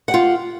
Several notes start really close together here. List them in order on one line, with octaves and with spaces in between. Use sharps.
F#5 G4 F4